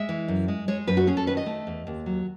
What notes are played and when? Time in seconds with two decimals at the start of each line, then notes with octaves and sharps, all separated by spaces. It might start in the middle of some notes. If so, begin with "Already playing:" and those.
Already playing: G#3 E5
0.09 E3
0.28 F#2
0.48 G#3
0.68 G#3 C#5
0.88 F#2 B4
0.97 F#4
1.07 C#4 G#4
1.17 A4
1.27 D#3 B4
1.37 D#5
1.46 A3
1.67 E2
1.87 D#2
2.06 F#3